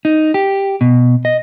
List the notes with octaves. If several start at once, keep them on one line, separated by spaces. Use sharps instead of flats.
D#4
G4
B2
D#5